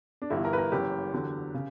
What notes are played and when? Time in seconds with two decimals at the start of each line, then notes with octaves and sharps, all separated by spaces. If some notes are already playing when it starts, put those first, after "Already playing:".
0.22 D4
0.30 G1 G2 E3 E4
0.45 A#4
0.53 B4
0.58 A#4
0.72 F#1 F#2 E3 G4
1.13 E2 D3 F#3
1.54 C#3